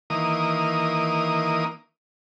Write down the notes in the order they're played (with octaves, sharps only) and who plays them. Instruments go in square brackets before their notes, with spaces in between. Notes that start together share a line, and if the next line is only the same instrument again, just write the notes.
[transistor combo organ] D#3 E3 A#3 D#6